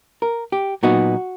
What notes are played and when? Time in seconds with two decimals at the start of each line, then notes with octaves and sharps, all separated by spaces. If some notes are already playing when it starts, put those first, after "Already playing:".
0.22 A#4
0.52 G4
0.83 A#2 F#3 B3 D#4 F#4